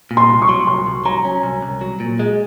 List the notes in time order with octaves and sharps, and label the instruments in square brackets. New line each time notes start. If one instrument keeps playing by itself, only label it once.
[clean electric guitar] A#2
[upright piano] C6
[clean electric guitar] C2
[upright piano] C#6
[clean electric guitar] F#3
[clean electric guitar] C2 [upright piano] C6
[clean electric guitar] C2
[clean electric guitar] F#3 [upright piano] A#5
[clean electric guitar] C#4
C2
C2
F#3
A#2
G#3